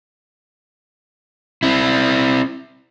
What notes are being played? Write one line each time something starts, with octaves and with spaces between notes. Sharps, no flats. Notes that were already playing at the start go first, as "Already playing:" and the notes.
C4 E4